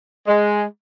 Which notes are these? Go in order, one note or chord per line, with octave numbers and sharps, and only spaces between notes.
G#3